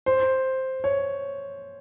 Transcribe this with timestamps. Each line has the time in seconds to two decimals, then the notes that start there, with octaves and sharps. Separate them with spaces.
0.06 C5
0.84 C#5